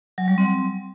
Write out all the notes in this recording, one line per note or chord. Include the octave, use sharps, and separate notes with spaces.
F#3
G3
C4